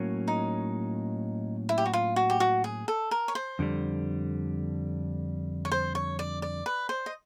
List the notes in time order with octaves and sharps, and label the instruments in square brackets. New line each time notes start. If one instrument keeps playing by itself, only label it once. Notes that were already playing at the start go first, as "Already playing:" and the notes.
Already playing: [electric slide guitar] A2 F#3 A#3 C#4
[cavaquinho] D#4
E4
G4
F#4
F4
F#4
G4
F#4
G#4
A4
A#4
C#5
C5
[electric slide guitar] F2 D3 G3
[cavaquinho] C#5
C5
C#5
D5
D5
B4
C5
D#5